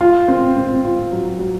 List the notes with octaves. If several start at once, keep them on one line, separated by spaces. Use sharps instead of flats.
F4
C4
C4
F4
F#3
F#3